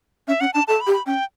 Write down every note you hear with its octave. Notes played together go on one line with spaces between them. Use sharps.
C#4 E5
C#4 F#5
D4 A5
A4 A5
B5
G4
B5
C#4 G5